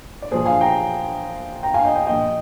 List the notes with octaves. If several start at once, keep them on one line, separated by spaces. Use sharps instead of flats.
D5
A#2 F3 G#4 C5
F5 G#5
G5 A#5
G5 A#5
F5 G#5
D#5 G5
D#5 G5
A#2 F3 D#5 G5